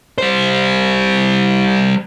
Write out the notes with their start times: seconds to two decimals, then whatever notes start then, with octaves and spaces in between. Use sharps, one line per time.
0.18 G3 C5